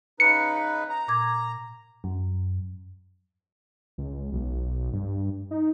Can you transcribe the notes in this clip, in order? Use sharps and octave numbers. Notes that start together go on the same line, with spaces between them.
C#3 D#4 B4 C#7
A#5
A#2 D6 G#6
F#2
C#2
B1
G2
D#4